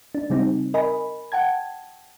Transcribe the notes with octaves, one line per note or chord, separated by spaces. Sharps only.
D4
C#3 G3 C4 D#4
A#4 D#5 G#5 B5
F#5 G5 A5 G#6